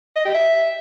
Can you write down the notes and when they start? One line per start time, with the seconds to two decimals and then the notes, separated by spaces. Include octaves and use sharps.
0.16 D#5
0.25 G4
0.34 E5